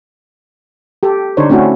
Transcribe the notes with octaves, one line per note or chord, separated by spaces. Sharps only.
G4 A4
D3 D4 D#4 C5 C#5
A3 C4 C#4 E4 F#4